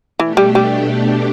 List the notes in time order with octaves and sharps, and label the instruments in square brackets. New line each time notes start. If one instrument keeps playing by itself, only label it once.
[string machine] B2 A3 D4 G4 [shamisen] E3
[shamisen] G3
G3